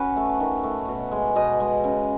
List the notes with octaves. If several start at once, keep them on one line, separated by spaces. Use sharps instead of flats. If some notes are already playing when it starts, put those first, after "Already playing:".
Already playing: C#4 F#4 B4
A3
D#3
A3
B2
G#3
B2 D#5
G#3
C#3